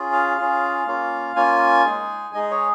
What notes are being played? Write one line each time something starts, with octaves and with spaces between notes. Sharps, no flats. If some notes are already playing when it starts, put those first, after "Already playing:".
Already playing: C#4 F4 G#4
F5
C#4 F4 G#4
A#3 C#4 F4
A#3 C#4 F4 G#5
G#3 D#4 G#4
G#3 D#4 G#4 D#5
C#5